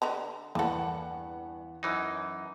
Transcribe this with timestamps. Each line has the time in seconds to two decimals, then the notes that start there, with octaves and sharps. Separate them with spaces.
0.02 D3 B4 A#5
0.55 E2 G2 A#3 A4 F#5
1.83 F#2 E3 D#4